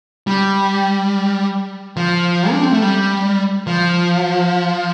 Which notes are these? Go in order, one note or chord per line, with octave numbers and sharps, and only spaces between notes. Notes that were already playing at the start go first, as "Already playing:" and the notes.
G3
F3
D4
C4
A3
G3
F3